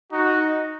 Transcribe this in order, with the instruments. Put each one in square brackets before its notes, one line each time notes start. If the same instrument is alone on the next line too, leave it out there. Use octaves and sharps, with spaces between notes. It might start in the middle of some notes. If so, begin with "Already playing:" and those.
[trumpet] D#4 [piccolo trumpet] F#4